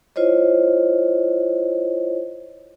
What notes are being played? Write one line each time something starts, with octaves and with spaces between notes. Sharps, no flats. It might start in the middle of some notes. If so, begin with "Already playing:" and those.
E4 F4 C5 C#5 D#5